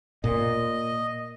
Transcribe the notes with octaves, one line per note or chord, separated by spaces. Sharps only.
A#2 D#5